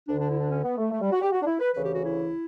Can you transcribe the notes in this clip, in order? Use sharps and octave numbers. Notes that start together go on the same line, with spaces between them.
D2 D3 D4
D4
E4
D4
C#4
B3
A3
A3
G3
F#4
G4
F#4
D4
E4
B4
D2 C#3 E3 B4
G4
F#4
E4